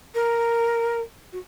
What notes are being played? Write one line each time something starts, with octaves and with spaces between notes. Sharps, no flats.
A#4
F#4